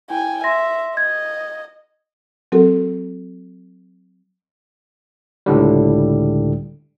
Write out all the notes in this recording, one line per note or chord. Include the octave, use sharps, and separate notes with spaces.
E4 G5 G#5
E5 C6 A#6
D#5 G#6
F#3 C4 F#4 A4 A#4
C#2 A2 D3 G3